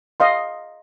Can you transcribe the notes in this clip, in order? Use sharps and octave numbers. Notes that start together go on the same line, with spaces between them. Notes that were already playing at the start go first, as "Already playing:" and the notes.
D#5 F5 C6